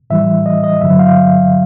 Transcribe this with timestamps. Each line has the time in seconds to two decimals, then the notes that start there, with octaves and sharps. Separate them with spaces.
0.10 A2 E3 G3 E5
0.46 D#5
0.64 D#5
0.81 G2 D3 F#3 E5
0.99 F5